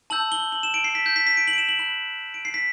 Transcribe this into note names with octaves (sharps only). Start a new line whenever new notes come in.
A5 E6 G6 F#7
G7
F#7
E7
D7
C7
B6
G6
B6
B6
D7
F#7
D7
E7
F#7
B5 F#6 F#7
D7
C7
B6